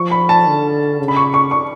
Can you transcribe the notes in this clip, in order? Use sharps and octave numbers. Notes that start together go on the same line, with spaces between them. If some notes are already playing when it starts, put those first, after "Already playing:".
Already playing: F3 C#6
B5
A5
D3
C#3
B5
C#6
C#6
C#6